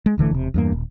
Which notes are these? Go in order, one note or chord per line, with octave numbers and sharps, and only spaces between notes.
G#3
D#1 D3 E3 A3
E1 C3
E2 G2 A#3
D#1